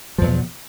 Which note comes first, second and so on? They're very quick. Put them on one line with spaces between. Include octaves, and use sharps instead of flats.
F3 E2 F#3 B2